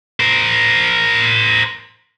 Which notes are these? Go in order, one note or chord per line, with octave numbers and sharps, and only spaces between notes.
A#4 C5